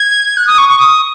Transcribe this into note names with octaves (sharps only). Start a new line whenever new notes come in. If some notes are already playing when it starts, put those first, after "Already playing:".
Already playing: G#6
F#6
D#6
C#6
C#6
D#6